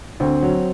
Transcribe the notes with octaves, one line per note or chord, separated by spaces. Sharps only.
D2 C4
F#3